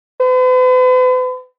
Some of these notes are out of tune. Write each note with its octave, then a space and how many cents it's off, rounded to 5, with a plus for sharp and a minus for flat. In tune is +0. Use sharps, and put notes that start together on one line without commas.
B4 +45